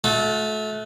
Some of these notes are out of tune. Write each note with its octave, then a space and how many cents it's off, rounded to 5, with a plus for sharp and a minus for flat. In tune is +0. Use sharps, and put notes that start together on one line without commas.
A3 -30 F#4 -45 A5 +0